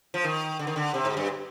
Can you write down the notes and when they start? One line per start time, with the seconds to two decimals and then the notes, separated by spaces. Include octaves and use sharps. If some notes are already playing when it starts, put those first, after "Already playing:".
0.14 F3
0.24 D#3
0.59 D3
0.67 D#3
0.76 D3
0.94 C3
1.05 G#2
1.17 G2